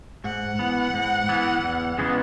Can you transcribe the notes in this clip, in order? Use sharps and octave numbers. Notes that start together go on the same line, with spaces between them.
G#2 F#5
E3 B3
G#2
E3 B3
E2
C#3 E3 G#3 B3